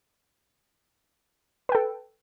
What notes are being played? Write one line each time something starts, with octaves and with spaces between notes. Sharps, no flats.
A4 B4 G5